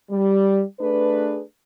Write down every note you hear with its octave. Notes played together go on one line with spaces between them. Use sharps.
G3
A3 D4 G#4 B4